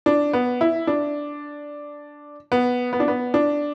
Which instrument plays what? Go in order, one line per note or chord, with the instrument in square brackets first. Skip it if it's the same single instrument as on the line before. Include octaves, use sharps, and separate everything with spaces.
[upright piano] D4
B3
E4
D4
B3
B3
D4
B3
D4